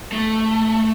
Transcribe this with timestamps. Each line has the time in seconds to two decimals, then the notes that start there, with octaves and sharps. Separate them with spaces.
0.12 A3